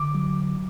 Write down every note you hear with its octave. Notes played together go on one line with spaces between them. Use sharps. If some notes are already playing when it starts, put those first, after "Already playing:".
Already playing: D3 D6
F#3